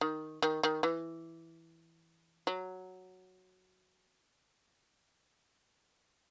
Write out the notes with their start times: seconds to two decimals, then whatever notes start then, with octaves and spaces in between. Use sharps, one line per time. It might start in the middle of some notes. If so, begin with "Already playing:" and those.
0.01 D#3
0.42 D#3
0.63 D#3
0.83 E3
2.47 F#3